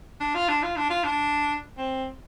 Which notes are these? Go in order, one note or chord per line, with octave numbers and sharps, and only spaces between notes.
D4
F4
D4
F4
D4
F4
D4
C4